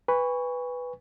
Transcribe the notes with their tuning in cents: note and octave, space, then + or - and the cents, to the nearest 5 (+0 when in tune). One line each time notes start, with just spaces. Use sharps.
B4 +0 G#5 -35 C#6 +10